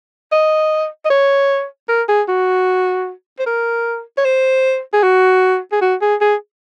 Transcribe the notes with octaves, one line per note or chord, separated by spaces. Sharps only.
D#5
D#5
C#5
A#4
G#4
F#4
C5
A#4
C#5
C5
G#4
F#4
G#4
F#4
G#4
G#4